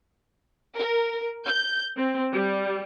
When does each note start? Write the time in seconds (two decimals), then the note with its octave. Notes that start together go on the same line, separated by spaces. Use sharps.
0.75 A#4
1.47 G6
1.96 C4
2.31 G3